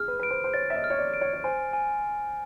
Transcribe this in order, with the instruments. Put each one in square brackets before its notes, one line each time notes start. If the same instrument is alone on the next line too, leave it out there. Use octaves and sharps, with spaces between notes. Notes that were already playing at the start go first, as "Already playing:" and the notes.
Already playing: [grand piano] G#4 [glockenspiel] F6
[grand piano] B4
[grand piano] B4 [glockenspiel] D7
[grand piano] C5
C5
[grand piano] C#5 [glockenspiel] A6
[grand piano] E5
D#5
[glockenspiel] F6
[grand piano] C#5
D5
[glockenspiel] D7
[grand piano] C#5
C#5
[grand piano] C5 [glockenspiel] G#5
[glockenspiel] G#5